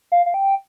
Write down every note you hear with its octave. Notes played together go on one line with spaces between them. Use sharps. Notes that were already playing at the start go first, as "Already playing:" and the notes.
F5
F5
G5